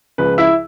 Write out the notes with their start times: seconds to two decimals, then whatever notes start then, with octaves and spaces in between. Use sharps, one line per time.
0.18 C#2 C#3 F3 B4
0.38 E4 E5